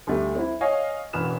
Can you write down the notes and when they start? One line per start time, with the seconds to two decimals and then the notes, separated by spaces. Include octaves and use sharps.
0.07 D2 G3 A3
0.35 C4 E4
0.61 C#5 D#5 F5 G#5
1.13 E1 A1 B4 F6 E7